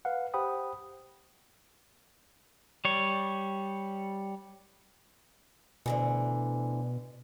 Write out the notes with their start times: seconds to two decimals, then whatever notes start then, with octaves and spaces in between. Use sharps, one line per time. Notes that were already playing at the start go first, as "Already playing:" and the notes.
0.05 B4 F5 F#5
0.34 G4 C5 F#5 G5 B5 D#6
2.85 G3 C#5
5.86 D2 B2 D3 E3